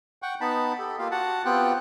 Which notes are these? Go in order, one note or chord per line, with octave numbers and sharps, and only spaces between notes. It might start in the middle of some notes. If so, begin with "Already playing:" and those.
F#5 G5 C#6
B3 D#4 A5 B5
G4 A4
A#3 F4 G4 F5
F#4 F#5 A5
B3 C4 F4 G4 G5 F#6